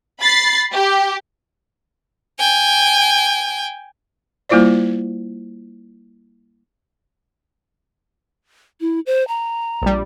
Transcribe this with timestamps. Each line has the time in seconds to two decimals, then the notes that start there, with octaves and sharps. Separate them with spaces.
0.20 B5 A6 C7
0.72 G4
2.39 G5 G#5
4.49 G3 A#3 E4 F4 C5 D5
8.81 E4
9.06 C5
9.28 A#5
9.82 A#1 G3